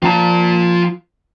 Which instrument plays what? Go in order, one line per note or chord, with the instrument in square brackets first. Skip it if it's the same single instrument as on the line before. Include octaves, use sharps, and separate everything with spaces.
[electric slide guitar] F3 A5 [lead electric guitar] F4 A#5